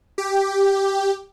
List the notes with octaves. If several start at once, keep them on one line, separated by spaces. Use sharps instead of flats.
G4